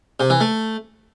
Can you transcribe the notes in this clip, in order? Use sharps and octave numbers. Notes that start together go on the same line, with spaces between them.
C3
E3
A3